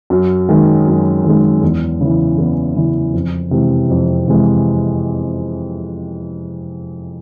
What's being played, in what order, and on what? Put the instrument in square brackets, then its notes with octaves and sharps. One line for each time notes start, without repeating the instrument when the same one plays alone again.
[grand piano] F#2
D#3 G#3
F#2
D#3
G#3
E2
C#3 E3
E2
C#3 E3
F2
C3 E3 G#3
F2
C3 E3 G#3